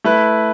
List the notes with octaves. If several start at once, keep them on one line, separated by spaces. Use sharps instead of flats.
A3 E4 B4